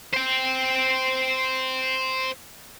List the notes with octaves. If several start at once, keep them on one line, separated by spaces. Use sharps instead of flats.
C5 G5